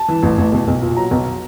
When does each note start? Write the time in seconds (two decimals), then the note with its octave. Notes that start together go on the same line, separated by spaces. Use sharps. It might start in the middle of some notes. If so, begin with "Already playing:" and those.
Already playing: A5
0.08 E3
0.23 A1
0.38 A1
0.52 B1
0.68 B1
0.82 A#2
0.97 F#3 A#5
1.11 B1